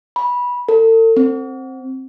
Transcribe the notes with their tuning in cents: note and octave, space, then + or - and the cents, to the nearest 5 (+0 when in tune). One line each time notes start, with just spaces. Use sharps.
B5 -15
A4 +40
C4 +10